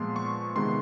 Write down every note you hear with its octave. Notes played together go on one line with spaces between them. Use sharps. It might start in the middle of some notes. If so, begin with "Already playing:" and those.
Already playing: A#2 F3 G#3 B3 C6
C#6
C3 D#3 G#3 B3 C6